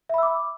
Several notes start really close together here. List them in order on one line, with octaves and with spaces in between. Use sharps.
E5 B5 E6 D6